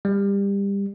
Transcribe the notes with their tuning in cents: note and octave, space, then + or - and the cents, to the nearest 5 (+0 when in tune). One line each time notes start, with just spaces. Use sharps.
G3 +25